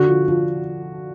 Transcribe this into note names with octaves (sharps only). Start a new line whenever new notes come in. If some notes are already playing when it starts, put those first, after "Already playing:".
Already playing: D3 F#4
F3
F3